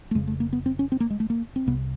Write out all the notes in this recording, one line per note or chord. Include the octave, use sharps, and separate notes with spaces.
A3
F1 F2 C#3 G#3
A3
A#3
B3
C4
C#4
C4
A#3
G#3
A3
A#3
C4
C2 C3 B3